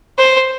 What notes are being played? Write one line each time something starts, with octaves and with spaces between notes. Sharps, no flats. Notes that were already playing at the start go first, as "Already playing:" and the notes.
C5